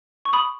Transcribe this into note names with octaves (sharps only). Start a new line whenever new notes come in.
C#6
B5 D#6